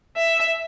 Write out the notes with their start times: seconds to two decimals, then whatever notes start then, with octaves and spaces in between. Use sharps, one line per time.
0.17 E5